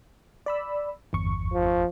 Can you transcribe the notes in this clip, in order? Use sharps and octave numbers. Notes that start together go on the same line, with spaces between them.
D5 B5 E6
G1 E2 C#6
F3